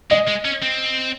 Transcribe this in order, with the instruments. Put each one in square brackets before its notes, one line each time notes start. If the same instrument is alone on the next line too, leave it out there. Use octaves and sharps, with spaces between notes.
[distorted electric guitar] G#3 [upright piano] D#5
[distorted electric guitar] G#3
C#4
C4